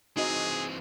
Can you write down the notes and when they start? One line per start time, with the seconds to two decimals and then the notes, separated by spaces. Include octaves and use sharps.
0.17 E3 C4 D#4 F#4 G#4 D#5